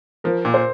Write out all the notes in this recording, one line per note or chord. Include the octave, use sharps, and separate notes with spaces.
F3 A#4
A#2
C5